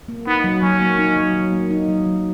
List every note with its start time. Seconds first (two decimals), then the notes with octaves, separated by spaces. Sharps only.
0.08 A#3
0.27 B3 D#4
0.44 F#3
0.62 F#3 C#4
0.81 A#3
0.99 D#4
1.17 F#3
1.34 F#3
1.52 A#3
1.71 D#4
1.88 F#3
2.07 F#3